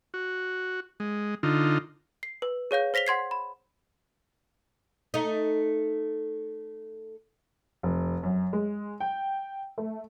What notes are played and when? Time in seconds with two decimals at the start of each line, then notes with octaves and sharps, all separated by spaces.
0.14 F#4
1.00 G#3
1.43 D3 D#4 F4
2.23 C7
2.42 B4
2.71 G#4 C#5 F5 G6
2.94 C5 A#6 B6 F7 G7
3.07 F#5 C6 G#6 C7
3.31 B5
5.14 A3 D#4
7.83 F1
8.23 F#2
8.53 G#3
9.00 G5
9.78 A3